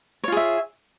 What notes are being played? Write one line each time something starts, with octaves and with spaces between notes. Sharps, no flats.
F4 G#4 C#5 E5